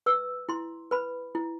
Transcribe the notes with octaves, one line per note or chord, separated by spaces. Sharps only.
B4 E6
E4 C6
B4 B5
E4